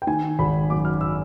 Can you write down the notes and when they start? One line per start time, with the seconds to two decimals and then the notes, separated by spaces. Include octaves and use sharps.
0.02 G5
0.07 D#3 G#5
0.39 G#1 B5
0.70 F#2 D6
0.85 F6
1.01 E6